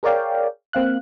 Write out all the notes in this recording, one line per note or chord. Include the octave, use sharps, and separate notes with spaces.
G#4 A#4 C#5 D5 F5 G5
A#3 C4 F5 F#6